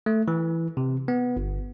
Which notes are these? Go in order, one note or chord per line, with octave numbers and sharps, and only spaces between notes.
A3
E3
C3
B3
G1